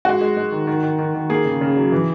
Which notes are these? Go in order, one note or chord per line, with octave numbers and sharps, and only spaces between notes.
G#3 F#4
G#3
G#3
D#3
D#3
D#3
D#3
D#3
A#3 G#4
C#3
C#3
F#3
E3